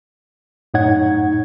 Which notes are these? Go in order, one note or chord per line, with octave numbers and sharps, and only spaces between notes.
F#2 A2 D#4 C#5 F#5 G#6